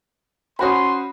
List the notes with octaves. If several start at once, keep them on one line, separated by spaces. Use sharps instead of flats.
C#4 F#4 C5 B5 C6 D#6